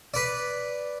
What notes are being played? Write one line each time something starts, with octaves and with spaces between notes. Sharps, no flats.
B4 D5